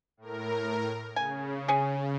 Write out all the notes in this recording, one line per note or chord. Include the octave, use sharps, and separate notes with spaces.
A2 A#4
C#3 G#5
C#4 G#4